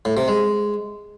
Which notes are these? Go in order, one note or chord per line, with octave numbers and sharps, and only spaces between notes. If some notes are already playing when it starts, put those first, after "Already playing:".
A2
C3
G#3